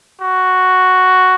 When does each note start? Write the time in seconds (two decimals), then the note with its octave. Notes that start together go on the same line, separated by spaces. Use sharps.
0.21 F#4